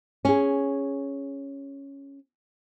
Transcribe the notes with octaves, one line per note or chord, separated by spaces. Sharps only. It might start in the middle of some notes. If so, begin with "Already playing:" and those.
C#4 G#4